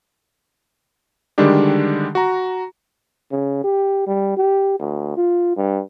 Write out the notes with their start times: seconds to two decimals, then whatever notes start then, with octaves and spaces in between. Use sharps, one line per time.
1.38 D3 D#3 G3 G#3 D4 G4
2.15 F#4 A#5
3.31 C#3
3.64 G4
4.07 G3
4.37 G4
4.79 D2
5.17 F4
5.57 G2